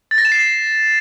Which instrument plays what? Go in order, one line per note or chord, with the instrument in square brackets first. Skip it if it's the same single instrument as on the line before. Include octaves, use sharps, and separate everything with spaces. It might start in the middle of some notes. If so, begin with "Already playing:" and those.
[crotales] A6
A#6
E7
C7